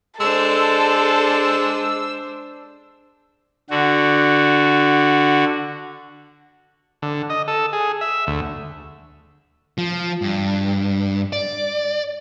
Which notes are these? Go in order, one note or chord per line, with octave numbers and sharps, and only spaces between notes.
G#3 D4 A4 C5 E6
D3 F#4
D3
D#5
A4
G#4
E5
D2
F3
G2
D5